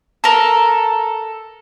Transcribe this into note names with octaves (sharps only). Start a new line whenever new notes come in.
A4 A#4